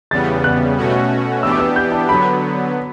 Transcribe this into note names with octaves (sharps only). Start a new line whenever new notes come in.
E2 C#3 G3 B3 A6
F#6
B2 A3 C#4 F#4
E3 B3 D4 G4 E6
D6
E6
G6
A5
D3 F#3 B3 B5